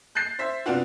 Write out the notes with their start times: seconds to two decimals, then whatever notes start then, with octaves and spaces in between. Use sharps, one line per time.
0.15 F#6 G6 A6 C7
0.39 C5 E5 B6
0.66 C3 B3 D4 F4 F#4